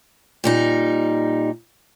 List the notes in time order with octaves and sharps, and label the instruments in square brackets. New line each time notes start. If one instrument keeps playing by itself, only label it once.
[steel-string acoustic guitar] A#2 G3 D#4